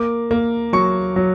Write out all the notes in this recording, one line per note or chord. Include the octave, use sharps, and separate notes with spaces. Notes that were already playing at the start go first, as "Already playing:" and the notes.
Already playing: A#3 D6
A#3
F#3 C#6
F#3